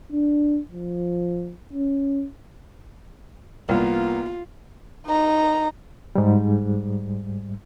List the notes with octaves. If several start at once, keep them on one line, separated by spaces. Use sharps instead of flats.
D4
F3
C#4
C2 A#3 B3 F4
D#4 A#5
G#2 G3